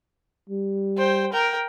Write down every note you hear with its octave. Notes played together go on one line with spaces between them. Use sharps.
G3
C5 G5
A#4 G5